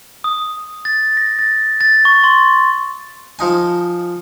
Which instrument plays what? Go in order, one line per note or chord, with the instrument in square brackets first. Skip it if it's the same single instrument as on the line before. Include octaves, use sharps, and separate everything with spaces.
[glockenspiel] D#6
A6
A#6
A6
A6
C#6
C6
[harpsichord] F3 D#4 G#5